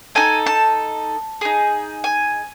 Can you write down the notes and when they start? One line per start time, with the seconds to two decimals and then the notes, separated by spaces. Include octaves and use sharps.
0.15 D#4 A4 G#5
0.46 A5
1.41 D#4 G#4
2.04 G#5